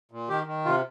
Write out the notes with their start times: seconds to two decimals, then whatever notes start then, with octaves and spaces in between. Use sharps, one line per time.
0.11 A#2
0.28 D#3 G4
0.47 D#3
0.65 C3 F4